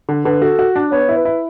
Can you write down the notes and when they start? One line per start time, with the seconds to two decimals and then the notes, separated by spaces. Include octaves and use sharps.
0.09 D3
0.25 D3 B4
0.42 F#4 A4
0.59 F#4
0.76 D4
0.92 B3 C#5
1.09 E4
1.17 B4
1.25 E4